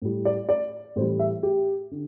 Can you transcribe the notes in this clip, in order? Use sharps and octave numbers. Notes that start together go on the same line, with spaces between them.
A2 G3
D5
D5
A2 E3 G3 C5
E5
G4
D3